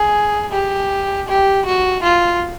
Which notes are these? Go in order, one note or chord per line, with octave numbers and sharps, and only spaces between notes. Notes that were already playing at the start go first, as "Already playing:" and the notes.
Already playing: G#4
G4
G4
F#4
F4